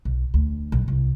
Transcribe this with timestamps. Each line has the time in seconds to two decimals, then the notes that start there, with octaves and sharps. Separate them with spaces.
0.05 B1
0.34 D2
0.72 B1
0.88 C2